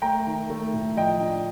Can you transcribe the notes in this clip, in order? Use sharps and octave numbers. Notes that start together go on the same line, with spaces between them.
A3 G5 A#5
D#3
A3
A2
F3 D#5 G5
D4